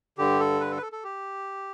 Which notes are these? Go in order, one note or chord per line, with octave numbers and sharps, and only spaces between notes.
G2 D3 G4
A4
B4
A4
B4
A4
A4
G4